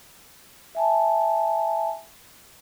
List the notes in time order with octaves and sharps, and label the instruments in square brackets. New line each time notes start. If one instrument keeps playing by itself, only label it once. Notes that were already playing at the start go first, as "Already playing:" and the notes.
[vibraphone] E5 G#5 A5